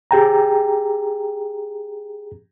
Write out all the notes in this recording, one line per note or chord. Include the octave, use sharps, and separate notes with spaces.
G4 G#4 G5 A#5